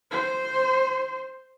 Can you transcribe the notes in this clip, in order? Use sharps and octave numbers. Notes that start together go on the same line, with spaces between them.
C5